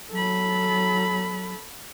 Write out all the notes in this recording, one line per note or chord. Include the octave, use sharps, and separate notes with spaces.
F#3 A4 B5